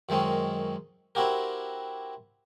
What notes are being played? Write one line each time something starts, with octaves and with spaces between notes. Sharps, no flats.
F#2 D#3 G#3 C4 C#4
C4 E4 F#4 G4 A#4